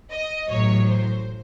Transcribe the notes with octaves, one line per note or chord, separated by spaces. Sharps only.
D#5
A1 A2 F#3 C#5
C5